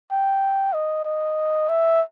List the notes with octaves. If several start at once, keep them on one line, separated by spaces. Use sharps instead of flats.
G5
D#5
D#5
E5